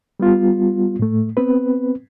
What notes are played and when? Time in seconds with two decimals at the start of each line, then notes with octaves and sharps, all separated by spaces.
0.20 G3 B3 F4
0.99 A2 A3
1.37 B3 C4 B4